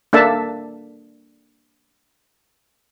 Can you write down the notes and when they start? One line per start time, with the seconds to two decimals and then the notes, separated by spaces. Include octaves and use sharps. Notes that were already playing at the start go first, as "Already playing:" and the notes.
0.13 A#3 D4 A4 E5 A5